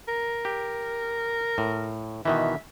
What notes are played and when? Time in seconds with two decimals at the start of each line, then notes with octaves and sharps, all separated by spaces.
0.08 A#4
0.45 G4
1.58 A2
2.25 B2 D#3 E3 E5